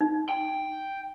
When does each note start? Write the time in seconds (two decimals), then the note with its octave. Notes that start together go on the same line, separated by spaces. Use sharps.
0.01 D#4
0.29 G5